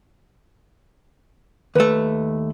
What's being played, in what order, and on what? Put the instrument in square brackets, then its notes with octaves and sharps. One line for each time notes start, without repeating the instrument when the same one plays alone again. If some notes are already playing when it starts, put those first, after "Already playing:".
[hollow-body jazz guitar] D#2 A3 [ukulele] B4